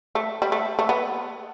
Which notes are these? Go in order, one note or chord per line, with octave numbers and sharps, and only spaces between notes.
A3
G3
A3
A3
B3